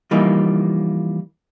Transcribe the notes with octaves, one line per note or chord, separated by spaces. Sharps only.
E3 F3 G3 A#3 D#4